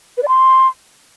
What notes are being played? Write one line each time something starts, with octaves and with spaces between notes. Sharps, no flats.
B4
D5
C6